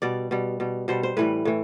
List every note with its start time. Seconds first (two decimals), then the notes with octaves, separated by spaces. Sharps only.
0.02 B2 G3 D5
0.31 B2 G3
0.60 B2 G3
0.88 B2 G3 C5
1.03 C5
1.17 A2 E3 G3 B4
1.45 A2 E3